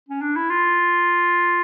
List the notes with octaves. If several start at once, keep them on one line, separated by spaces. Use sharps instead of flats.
C#4
D4
E4
F4